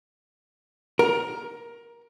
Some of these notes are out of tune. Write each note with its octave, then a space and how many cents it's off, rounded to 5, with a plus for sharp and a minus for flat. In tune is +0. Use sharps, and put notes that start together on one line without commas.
A#4 +15